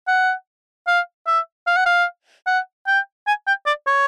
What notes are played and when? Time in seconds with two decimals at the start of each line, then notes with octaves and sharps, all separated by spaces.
0.07 F#5
0.87 F5
1.27 E5
1.67 F5
1.76 F#5
1.86 F5
2.47 F#5
2.87 G5
3.27 G#5
3.47 G5
3.66 D5
3.87 C#5